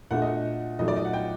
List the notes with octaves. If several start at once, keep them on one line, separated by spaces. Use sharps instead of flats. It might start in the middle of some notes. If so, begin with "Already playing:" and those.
A#2 A3 D4 F#5
D#5
A#2 F#3 A3 D#4 D#5
D5
D#5
F#5
G5